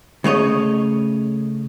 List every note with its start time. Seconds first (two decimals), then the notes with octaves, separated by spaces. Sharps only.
0.24 C#3 A3 C#5 D#5